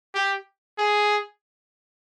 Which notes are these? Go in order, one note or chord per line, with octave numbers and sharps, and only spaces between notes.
G4
G#4